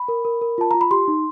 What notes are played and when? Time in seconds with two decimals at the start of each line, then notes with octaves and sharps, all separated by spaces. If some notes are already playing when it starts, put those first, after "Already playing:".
Already playing: B5
0.08 A#4
0.25 A#4
0.41 A#4
0.58 F4 A5
0.71 F4 A#5
0.81 B5
0.91 G4 C6
1.08 D#4